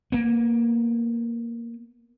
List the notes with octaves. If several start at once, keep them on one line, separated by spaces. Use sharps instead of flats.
A#3 B3